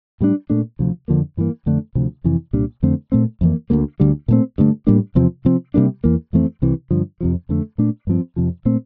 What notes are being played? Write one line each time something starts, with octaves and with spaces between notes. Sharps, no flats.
A2 G3 A#3 D4
A#2 A3 D4
D2 C3 F3
F2 D3 F3 A#3
G2 E3 A#3
F2 D3 A3 D4
D2 C3 F3
F2 C3 E3
C2 A#2 G3 D4
F2 D3 A3 C4
A#2 A3 C4
F2 E3 A#3
D2 D3 G3 A#3
D2 D3 G3
A#2 A3 C4
G2 D3 A3
A2 G3 A#3 D4
E2 C3 F3 C4
C3 F3 C4
C3 G3 A#3 D4
E2 E3 A#3
F2 E3 A3 C4
C2 C3 E3
G2 D3 F3
F2 C3 F3
F2 D3 A3
A#2 A3 D4
G2 F3 C4
F2 C3 F3
A#2 A3 C4